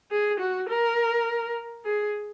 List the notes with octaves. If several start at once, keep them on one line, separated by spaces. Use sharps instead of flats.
G#4
F#4
A#4
G#4